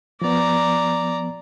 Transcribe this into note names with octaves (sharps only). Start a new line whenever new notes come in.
F3 B3 D5 A#5